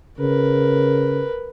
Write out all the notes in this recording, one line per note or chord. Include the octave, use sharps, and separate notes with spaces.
C#3 A#4 B4